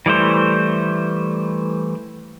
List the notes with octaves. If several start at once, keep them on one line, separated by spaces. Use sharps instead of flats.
E3 G3 A3 C5